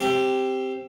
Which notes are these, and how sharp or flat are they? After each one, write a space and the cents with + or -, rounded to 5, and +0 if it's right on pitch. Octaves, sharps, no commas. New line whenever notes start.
C4 +0 G4 +0 E5 +25